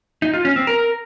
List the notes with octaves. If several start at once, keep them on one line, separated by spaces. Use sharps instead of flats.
D#4
F4
C#4
C4
A#4